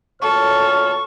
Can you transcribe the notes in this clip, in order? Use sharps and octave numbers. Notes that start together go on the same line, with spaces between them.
D2 A#2 A4 C#5 C#6 F6